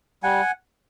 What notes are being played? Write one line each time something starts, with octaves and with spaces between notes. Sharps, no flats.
G3 F#5 G#5